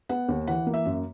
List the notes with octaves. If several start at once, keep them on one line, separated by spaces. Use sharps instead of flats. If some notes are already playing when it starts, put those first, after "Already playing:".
B3 F#5
D#2
E3 F#5
A#3
E5
F#2